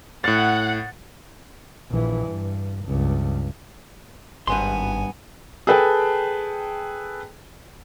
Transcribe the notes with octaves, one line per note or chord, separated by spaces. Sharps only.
A2 F#5 A6
A#1 E3
G2
C#2 G2
G#1 G2 B3 G#5 C6
G#4 A4 B4 G5 A5